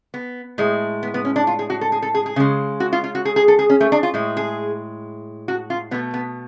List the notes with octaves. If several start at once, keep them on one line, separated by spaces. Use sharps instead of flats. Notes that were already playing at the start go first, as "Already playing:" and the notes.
B3
A2 G#3
B3
B3
C#4
D4
F4
G#4
F#4
A4
G#4
A4
G#4
G#4
C#3 G#3
F#4
F4
F4
F#4
G#4
G#4
A4
G#4
C#4
A3
D4
F4
A2 G#3
G#4
F#4
F4
B2 A3 B3
B3